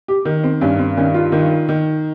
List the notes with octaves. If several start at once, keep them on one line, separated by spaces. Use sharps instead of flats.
G4
D#3 D#4
C4
G2 C#4
C4
D#3 C#4
F4
D#3
D#3